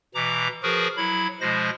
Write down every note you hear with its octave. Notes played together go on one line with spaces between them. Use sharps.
B2 E3 A#5 D6
F3 F#4 G#4 A#4 B4
F#3 E4 B5
B2 F3 G#3 C5 A#6